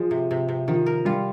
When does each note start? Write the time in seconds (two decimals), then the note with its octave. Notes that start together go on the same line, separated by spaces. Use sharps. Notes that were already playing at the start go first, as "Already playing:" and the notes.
Already playing: F3 G#3
0.11 C3
0.31 C3
0.49 C3
0.68 D#3 F3
0.86 A#4
1.05 G3 F4